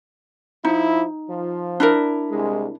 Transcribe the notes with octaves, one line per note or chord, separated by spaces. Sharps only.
F3 D#4 E4
F3
D4 E4 A#4
C2 G#3